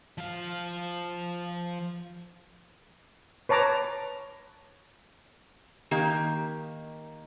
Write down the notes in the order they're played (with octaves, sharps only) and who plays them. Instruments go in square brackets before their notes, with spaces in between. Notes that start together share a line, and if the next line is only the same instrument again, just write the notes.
[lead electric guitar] F3 F5
[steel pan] B4 C#5 A5 A#5 D6
[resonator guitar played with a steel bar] D#3 A#3 G4